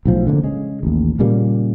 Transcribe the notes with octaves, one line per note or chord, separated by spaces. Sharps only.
B1 A2 F3
D3 E3 A#3
C#3 G#3
A1 D#2
A#2 C#3 G3 A#3